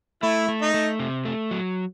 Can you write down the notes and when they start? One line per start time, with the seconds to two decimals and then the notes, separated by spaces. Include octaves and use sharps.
0.22 A3 E4
0.48 A3
0.61 D#4
0.74 A3
0.99 C3
1.25 A3
1.51 F#3